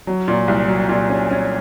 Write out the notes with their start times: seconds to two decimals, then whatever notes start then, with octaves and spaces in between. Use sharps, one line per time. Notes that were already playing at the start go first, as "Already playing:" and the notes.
0.07 F#3
0.28 A#2
0.48 C2
0.68 F#3
0.89 A#2
1.10 C#4
1.30 C#4